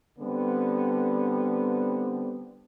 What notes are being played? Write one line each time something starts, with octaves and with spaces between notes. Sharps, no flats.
D3 G3 B3 C4